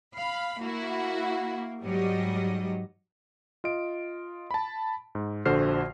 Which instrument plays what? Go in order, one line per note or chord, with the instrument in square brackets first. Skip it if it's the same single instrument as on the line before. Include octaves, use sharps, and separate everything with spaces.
[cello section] F5 [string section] B5
[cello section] A#3 [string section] E4 F#4
[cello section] G#2 F#3 [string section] G3 D#5
[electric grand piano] F4 D#5 D7
A5 B5
G#2
A#1 D3 F#4 C5 F6 C7